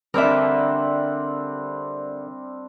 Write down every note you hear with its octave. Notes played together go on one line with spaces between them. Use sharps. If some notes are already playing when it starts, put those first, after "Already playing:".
D3 G3 C4 D4 A#4 E5